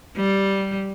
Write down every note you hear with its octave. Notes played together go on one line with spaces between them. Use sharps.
G3